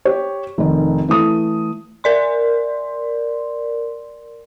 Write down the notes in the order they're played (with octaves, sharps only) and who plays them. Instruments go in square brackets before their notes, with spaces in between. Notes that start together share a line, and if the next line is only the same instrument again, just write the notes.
[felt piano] G4 C#5
F1 D#3
E3 A3 D#6
[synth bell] A#4 D5 C6